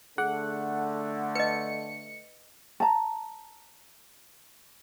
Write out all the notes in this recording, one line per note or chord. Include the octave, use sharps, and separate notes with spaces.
D3 A3 G#4 F#5
B4 D#5 C#7
A5 A#5